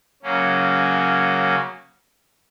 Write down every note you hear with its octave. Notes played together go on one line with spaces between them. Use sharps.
C#3 F#3 A#3 C#4